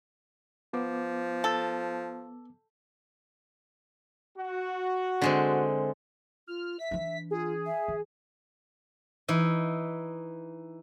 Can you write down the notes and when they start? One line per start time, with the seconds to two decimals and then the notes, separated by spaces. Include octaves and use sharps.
0.73 F3 B3 D6
1.44 A4
4.38 F#4
5.22 D3 G#3 C4
6.47 F4 F6
6.79 E5 B6
6.91 E3 D4
7.31 F4 G#4
7.66 E5
7.88 E3
9.28 E3 D#4